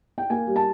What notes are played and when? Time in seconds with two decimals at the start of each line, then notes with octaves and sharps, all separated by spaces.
0.18 G5
0.30 A#3 G#5
0.47 G3
0.56 A5